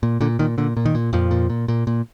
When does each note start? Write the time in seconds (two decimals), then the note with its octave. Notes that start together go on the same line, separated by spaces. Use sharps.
0.03 A#2
0.21 A#2 D3
0.39 A#2 D#3
0.58 A#2 D3
0.77 A#2
0.85 D#3
0.95 A#2
1.13 F2 A#2 F3
1.31 A#2
1.50 A#2
1.68 A#2
1.87 A#2